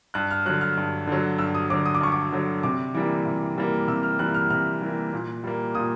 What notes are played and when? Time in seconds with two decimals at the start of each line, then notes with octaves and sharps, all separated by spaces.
0.14 G2 F#6
0.31 F6
0.46 F#3 F#6
0.49 D3
0.61 F6
0.77 G2
1.07 D3 F#3
1.38 G2 E6
1.55 D#6
1.70 D3 F#3 D6
1.86 D#6
1.95 D6
2.01 G2 C#6
2.12 D6
2.32 D3 F#3
2.63 C3 D6
2.95 E3 G3 A#3
3.25 C3
3.56 E3 G3 A#3
3.88 C3 E6
4.03 F6
4.19 E3 G3 A#3 F#6
4.34 F6
4.50 C3 F6
4.81 E3 G3 A#3
5.13 A#2
5.44 G3 A#3
5.75 A#2 D#6